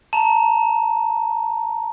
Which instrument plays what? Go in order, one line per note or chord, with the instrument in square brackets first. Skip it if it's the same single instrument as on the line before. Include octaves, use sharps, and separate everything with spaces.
[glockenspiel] A5 A#5